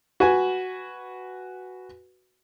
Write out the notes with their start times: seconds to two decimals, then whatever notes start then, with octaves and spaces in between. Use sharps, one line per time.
0.20 F#4 B4 G#5